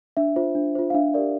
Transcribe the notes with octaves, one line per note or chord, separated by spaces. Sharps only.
D4 E5
F4 C5
D4
F4 C5
F5
D4 E5
G4 A#4 D5